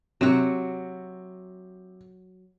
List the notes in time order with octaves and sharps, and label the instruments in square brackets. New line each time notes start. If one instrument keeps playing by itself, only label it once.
[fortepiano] C3 [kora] F#3 F#4